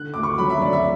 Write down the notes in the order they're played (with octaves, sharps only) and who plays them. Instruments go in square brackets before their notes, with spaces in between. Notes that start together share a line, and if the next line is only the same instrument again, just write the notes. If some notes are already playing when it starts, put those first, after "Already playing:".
Already playing: [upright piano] D3 F#6
D2 D6
C#6
F#3 B5
E5
D2 D5
E5